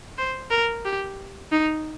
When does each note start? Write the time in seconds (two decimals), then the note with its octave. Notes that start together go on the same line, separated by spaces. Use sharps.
0.18 C5
0.51 A#4
0.85 G4
1.52 D#4